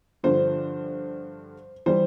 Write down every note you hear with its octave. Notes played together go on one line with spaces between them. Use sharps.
G2 D3 F3 C5
E3 G3 C5